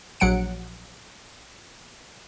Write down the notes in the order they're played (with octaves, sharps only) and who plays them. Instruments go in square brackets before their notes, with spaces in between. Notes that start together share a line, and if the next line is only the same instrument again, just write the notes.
[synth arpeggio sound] A#1 F#3 F#5 C#7 D7